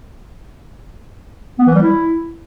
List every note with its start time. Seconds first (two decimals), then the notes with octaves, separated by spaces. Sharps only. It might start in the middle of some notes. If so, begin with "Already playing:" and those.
1.59 B3
1.67 E3
1.75 G3
1.83 E4